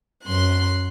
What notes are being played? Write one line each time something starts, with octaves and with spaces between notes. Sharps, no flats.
F#2 C6 F#6